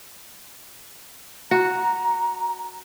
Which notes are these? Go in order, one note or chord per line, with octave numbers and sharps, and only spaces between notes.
F#4 A#5